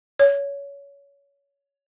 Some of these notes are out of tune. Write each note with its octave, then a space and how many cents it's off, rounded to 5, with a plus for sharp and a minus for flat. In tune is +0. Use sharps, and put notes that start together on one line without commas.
C#5 +20